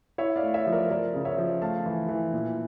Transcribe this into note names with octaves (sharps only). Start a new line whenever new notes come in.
E4 C#5 E5
D5 F5
A3
C#5 E5
F3
A#4 D5
F3 A#4 D5
C#3
C#5 E5
F3
A3 F5 A5
E3
E3
A#2